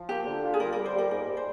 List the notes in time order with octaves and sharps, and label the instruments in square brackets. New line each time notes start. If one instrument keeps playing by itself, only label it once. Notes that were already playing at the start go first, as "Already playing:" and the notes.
Already playing: [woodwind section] F3
[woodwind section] A#3 [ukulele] G4
[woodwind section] D3
F4
[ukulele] G#4
[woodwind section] G3 [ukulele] A#4
[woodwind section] G3 [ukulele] A#4
[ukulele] C5
[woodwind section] G3 [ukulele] A#4
[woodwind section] G#2 [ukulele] A#4
[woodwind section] G3
[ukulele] C5